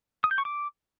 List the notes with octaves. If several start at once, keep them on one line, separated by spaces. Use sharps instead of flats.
D#6
G6
C#6
D6